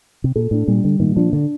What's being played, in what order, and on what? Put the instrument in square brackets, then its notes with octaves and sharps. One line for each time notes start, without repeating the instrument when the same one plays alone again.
[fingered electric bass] C3
[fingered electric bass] A#2 [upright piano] A4
[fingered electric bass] A2 [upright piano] D4
[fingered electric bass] A#2 [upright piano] G3
[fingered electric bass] D3 [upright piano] G3
[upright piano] A#2 [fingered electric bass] D#3
[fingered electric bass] F3 [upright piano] D4
[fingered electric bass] D3 [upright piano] D4